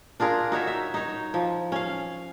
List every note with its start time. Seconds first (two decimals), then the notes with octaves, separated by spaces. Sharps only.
0.20 D4 F4 G#4 A#4
0.52 D#4 F#4 C#5 E5
0.67 E5
0.94 D#4 C#5
1.34 F3
1.72 C#4 F5